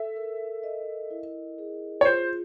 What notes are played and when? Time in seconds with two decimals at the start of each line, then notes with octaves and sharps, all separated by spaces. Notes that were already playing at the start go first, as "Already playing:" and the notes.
Already playing: A4 E5
0.16 A#4
0.63 D#5
1.10 E4
1.58 G#4
2.01 C#5
2.05 F4 C5